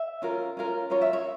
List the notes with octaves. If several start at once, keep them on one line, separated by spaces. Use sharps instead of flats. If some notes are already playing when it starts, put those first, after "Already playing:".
Already playing: E5
C#4 F4 A#4
C#4 F4 A#4
C#4 F4 A#4 C#5
E5
C#5